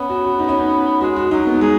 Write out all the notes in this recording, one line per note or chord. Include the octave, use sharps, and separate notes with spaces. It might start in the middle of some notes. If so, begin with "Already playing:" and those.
Already playing: B3 C#4
F#4
F#4
D#4
C#4
D#4
G#3 F#4
F#4
F#3 D#4
B3
G#3 G#4